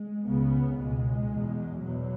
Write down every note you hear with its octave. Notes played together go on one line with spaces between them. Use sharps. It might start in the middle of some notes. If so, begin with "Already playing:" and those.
Already playing: G#3
C#2 C#3 B3
C#2 B2 G#3
E2 B2
E2 B2 F#3